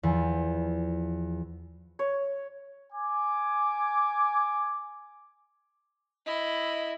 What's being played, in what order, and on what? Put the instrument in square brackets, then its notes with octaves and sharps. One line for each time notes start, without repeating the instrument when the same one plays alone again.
[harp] E2 F3
[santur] C#5
[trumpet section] G#5 D6
[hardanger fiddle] E4 [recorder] D#5